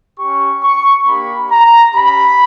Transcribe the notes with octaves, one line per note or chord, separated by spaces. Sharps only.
C#4 G4 C#6
C#6
A#3 D4 G4 B5
A#5
C#4 G4 B5